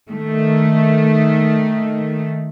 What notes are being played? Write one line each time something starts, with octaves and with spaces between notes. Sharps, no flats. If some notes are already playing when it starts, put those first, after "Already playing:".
D#3 A3